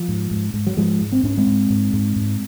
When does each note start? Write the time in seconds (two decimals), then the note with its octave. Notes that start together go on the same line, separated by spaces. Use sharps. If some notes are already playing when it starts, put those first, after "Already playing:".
Already playing: F3
0.08 G#2
0.31 G#2
0.54 G#2
0.67 F#3
0.77 G#2 F3 G#3
1.01 G#2
1.12 C4
1.23 G#2 C#4
1.37 G#3 C4
1.47 G#2
1.70 G#2
1.93 G#2
2.16 G#2